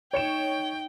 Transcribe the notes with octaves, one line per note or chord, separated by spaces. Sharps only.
D#4 C#5 G5 C#7 E7